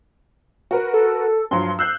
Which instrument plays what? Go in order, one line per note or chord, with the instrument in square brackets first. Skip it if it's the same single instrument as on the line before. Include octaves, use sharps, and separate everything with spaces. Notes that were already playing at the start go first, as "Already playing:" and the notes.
[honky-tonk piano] F#4 A#4 B4
[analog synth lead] A4
[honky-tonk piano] G2 F3 F#3 [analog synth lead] C6
[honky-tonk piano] E6 F#6 G6 [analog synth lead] C7